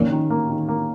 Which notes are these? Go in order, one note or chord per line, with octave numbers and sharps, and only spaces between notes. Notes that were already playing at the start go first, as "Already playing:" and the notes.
Already playing: A#2 D#3 C#4
D#3
A#3
D#3
A#3